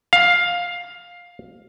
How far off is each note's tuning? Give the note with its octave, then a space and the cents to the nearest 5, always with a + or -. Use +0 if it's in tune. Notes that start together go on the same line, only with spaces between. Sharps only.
F5 +10